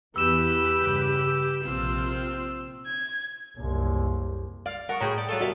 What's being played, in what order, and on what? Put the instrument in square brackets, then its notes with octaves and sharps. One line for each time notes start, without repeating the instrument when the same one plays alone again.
[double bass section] E2 E3 B3 [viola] G4 B4 [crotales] E6 E7
[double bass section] G2 C#3
[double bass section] A#1 C3 [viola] C4 F4
[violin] G#6
[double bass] F#1 C2
[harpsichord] D5 [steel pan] F5
[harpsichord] A#4 [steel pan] F#5 [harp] A5 C#6 D#6
[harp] A2 C#6 [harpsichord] C#4 F#4 G#4 [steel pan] G5 A#5
[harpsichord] D5
F#3 F4 A4
[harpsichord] C2 B2 F5 [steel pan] F#4